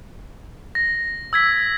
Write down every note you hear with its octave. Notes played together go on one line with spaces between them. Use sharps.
A#6
E6 G#6 B6